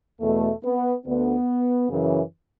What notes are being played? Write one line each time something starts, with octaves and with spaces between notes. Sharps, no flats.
E2 B2 A3
B3
D2 D3 B3
F#2 C#3 E3